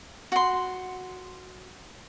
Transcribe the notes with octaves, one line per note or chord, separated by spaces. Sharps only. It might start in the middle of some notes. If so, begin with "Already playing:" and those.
F#4 C6